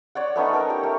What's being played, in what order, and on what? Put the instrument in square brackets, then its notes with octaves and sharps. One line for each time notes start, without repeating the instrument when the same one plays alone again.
[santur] C#5 D5 F#5
A3 B3 C#4 D#4
A4 A#4 A#5
G4
A3